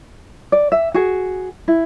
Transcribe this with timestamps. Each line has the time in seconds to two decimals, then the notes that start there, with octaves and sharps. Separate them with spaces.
0.52 D5
0.72 E5
0.94 F#4 G#4
1.68 E4